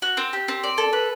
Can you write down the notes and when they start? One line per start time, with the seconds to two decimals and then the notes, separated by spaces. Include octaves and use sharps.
0.02 F#4
0.17 C4
0.33 G4
0.48 C4
0.64 D5
0.78 A4
0.93 B4